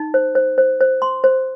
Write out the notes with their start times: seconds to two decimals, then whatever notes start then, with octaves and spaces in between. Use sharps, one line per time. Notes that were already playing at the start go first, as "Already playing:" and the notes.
Already playing: D#4
0.14 C5
0.35 C5
0.58 C5
0.81 C5
1.02 C6
1.24 C5